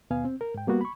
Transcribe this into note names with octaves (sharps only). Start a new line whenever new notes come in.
D#2 B2 B3 F5 G#5
C4
A#4
G#2 G5
G3 A#3 B3 F#4
B5 C#6